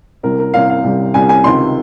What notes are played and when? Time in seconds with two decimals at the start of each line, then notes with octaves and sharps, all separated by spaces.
0.23 C2 C3 G3 A#4
0.39 A#4
0.54 C2 C3 G3 F5
0.70 F5
0.83 C2 C3 G3
1.14 C2 C3 G3 G#5
1.29 G#5
1.44 C#2 C3 D#3 C6